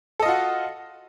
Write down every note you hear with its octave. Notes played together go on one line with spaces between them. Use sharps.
F4 F#4 A4 D#5